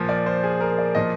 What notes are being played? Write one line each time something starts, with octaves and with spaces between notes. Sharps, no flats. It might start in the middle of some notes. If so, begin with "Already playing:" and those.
Already playing: A#2 F3
D5
C5
G#4
A#4
D5
A#2 F3 D#5